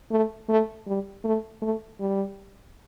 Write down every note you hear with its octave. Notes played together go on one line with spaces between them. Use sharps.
A3
A3
G3
A3
A3
G3